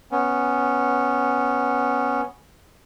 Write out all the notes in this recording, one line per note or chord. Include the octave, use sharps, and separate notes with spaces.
B3 C#4